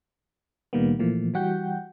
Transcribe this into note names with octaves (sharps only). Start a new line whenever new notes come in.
C#2 A#2 D#3 G3 A#3 B3
A#2 E3 F3 A3 A#3
E3 G3 F#4 F#5 G5 G6